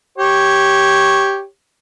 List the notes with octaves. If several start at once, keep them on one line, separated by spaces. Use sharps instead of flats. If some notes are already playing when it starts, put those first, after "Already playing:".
G4 C#5